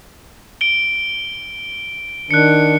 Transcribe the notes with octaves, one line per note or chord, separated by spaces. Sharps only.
D7 G7
D#3 D4 F#6 C#7